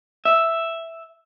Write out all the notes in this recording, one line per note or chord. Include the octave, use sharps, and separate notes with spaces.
E5